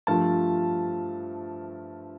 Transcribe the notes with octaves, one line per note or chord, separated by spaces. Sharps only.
G2 F3 A3 A5